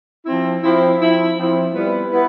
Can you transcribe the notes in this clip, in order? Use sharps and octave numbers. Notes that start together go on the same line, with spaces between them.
F3 C4 E4
F3 C4 E4
F3 C4 E4
F3 C4 E4
G3 B3 E4 B4
B3 E4 B4